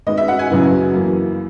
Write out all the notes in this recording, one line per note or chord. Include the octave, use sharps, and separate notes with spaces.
D#3 G#3 B3 D#5
E5
F#5
G#5
F#2 C#3 F#3 B3 E4
F#2 E3 A#3 E4